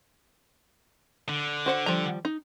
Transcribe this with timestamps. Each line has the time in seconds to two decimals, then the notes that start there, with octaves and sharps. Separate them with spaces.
1.29 D3
1.66 F#4 C5 F#5
1.86 F3 G3 A#5
2.25 D#4